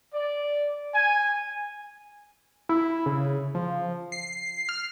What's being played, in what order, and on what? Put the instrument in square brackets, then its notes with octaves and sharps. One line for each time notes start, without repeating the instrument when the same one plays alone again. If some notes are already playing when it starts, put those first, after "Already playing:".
[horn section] D5
G#5
[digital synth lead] E4
C#3
F3
C7
F6